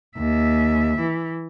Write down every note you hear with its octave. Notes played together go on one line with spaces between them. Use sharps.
D#2 E5
E3